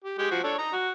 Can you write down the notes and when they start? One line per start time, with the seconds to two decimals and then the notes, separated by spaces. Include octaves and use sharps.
0.04 G4
0.19 G#3 G4 G5
0.31 F3 F#4
0.44 D4 A4 C#5
0.58 D#5 A#5
0.73 F#4